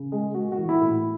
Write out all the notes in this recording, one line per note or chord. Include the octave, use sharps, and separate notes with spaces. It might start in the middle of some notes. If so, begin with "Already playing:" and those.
Already playing: C#3
G#3
G#3 F#4
F#4
E3
E4
A2
E4